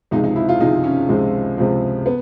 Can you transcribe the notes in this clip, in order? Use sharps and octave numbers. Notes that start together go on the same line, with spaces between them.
C#2 C3 F3 G#3 D#4
D#4
E4
F4
C#2 C3 F3 G#3 D#4
C#4
C#2 C3 F3 G#3
C#2 C3 F3 G#3
B3